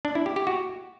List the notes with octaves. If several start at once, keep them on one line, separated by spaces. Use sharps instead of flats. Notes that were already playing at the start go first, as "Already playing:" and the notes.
D4
E4
G4
G4
F#4